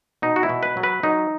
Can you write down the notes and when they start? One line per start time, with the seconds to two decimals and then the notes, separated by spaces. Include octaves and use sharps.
0.22 B2 D#4
0.36 F#4
0.43 E4
0.49 B2
0.63 B4
0.77 F#3
0.83 B4
1.03 F#3 D#4